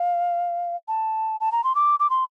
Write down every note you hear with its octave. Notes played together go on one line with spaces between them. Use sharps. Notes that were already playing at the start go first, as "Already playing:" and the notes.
Already playing: F5
A5
A5
A#5
C6
D6
D6
C6